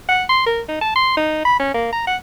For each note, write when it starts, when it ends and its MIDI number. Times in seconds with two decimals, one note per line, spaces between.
0.09 0.24 78
0.29 0.44 84
0.46 0.61 70
0.69 0.80 63
0.81 0.94 81
0.96 1.12 84
1.17 1.41 63
1.45 1.56 83
1.60 1.74 61
1.74 1.92 58
1.93 2.03 82
2.07 2.16 78